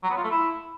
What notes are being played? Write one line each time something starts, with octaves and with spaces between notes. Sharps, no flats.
F#3
B3
F4
A3
E4